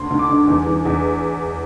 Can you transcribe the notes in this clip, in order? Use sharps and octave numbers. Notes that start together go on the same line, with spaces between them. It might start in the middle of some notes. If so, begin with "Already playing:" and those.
Already playing: D2 C6
D2
D6
D3
E2
E3
E2